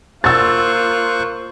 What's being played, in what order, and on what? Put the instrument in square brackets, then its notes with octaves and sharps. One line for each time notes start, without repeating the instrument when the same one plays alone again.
[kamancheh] A#3 F4 [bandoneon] C5 C#6 F#6 [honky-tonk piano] E6 A6